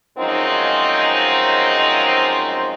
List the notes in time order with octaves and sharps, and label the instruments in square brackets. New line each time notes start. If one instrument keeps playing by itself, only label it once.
[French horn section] F#2 F3 G#3 C4 D#4